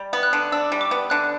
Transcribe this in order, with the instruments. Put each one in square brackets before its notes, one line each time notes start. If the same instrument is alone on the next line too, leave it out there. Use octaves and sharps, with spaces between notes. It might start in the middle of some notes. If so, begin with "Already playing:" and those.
Already playing: [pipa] G3
B3
[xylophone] F#6
[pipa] D3
[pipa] D4 [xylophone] E6
[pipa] G3
[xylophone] D6
[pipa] B3
[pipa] D3 [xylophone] F#6